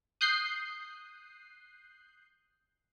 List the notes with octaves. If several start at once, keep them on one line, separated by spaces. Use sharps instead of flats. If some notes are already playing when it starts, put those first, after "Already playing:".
D#6 F#6 G6 C7